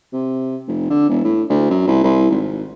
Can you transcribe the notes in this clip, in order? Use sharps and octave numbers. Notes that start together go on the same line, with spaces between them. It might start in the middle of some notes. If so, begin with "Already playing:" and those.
C3
F1
D3
E1
A2
D2
F#2
C2
C2
G#1